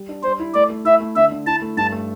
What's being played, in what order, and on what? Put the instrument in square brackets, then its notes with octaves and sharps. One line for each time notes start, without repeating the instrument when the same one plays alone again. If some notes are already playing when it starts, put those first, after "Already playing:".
Already playing: [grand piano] G3
D4
[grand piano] G3 [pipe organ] C5
[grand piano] E4
[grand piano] A3 [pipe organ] D5
[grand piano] A3
[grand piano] E4 [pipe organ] E5
[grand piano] A3
[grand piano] D3 [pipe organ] E5
[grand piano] D3
[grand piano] E4 [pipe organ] A5
[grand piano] A3
[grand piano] G2 [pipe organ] A5
[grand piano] A3